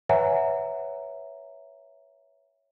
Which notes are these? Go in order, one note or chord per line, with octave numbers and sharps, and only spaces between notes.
B4 C#5 E5 F#5 G#5 A#5